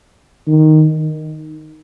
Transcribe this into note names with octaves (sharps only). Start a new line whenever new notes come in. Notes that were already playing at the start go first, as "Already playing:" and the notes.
D#3